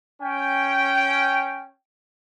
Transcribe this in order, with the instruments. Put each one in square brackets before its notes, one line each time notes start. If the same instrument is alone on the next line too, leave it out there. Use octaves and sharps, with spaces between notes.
[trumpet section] C#4 G5